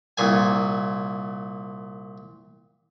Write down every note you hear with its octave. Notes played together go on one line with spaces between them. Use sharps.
C2 A#2 G#5